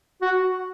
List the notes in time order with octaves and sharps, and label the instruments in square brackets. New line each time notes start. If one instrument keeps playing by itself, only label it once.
[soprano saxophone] F#4